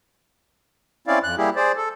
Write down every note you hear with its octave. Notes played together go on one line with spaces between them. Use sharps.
C4 C#4 E4 D5 F5
F2 F#6
G3 A#3 E4 G4 G#4
G#4 C5 D5
A4